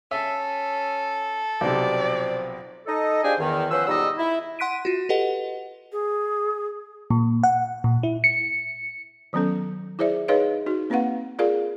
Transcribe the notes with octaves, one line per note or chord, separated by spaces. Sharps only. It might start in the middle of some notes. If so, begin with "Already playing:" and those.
C#4 A4 E5
B1 C3 F3 D5
D#4 A4 D#5
D4 F4 G4 G#4 C5 G#5
E2 D#3
F3 C#4 B4 C5 F#5 E6
G#2 B2 G3 D#4 D#5 E6
E4
F#5 C6 F#6 B6 D7 D#7
F4 F#4
G4 A4 B4 D#5 F#5
G#4
A#2
F#5
A#2
E4
C#7
D#3 F#3 B3 C#4 A4
E4 G#4 C5 D5 E5
D#4 G#4 B4 C#5 D#5 F5
D#4 F#4
A#3 C4 B4 F5 F#5
F4 G#4 A#4 D5 F5